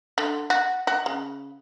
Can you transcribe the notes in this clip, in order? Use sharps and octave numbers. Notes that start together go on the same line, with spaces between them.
D3
F#4
F#4
C#3